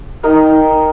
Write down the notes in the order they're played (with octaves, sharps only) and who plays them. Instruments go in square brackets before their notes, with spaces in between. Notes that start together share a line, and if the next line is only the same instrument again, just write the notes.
[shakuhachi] D#4 [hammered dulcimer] A#4 D#5 G5